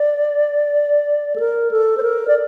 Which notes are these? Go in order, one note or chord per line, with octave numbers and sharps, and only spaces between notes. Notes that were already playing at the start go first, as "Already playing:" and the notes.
Already playing: D5
A4
A#4
A4
C5
A#4
D5